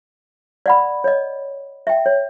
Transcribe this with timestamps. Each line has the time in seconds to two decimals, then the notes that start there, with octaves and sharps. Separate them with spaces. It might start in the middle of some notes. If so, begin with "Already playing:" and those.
0.66 D5 F#5 B5
1.04 C#5 D#5
1.87 E5 G5
2.06 C#5